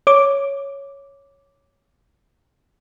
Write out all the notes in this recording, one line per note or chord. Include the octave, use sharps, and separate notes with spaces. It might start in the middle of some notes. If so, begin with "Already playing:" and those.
C#5 D6